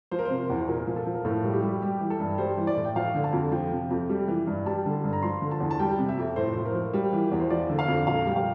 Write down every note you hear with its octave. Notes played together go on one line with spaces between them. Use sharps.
F3 C5
A#4
C3 C5
E2
A#2 A#4
F3
A4
F3
A#4
A2 A4
G3
G4
G3
G3 G4
E3
A4
G2
G3 C5
E3
D5
A2
G5
F3 F5
D3
A5
F2
F3 G5
C3
F2
G3
E3
G2
G3 A5
D3
G2
A#5
F3 C6
D3
A5
E2
A5
G3 G5
C3
E5
F2
A2 C5
F3 C5
A#4
F3
G3
E3
E2
C5
F3 D5
D3
F5
F2
A#2 F5
G3
G5
F5